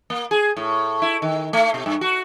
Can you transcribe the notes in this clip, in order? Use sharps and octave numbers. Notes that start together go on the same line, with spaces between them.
A#3
G#4
A2
E4
D#3
A3
B2
G2
F#4